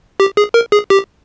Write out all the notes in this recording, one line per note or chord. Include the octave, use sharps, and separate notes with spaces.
G4
G#4
A#4
G#4
G4